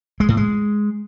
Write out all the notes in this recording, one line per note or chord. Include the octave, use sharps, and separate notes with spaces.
G#3
A2
G#3